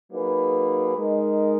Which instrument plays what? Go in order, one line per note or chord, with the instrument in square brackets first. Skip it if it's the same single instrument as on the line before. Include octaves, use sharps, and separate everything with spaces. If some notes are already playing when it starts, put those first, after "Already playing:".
[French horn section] F#3 A#3 D#4 G#4 B4
G#3 D#4 A#4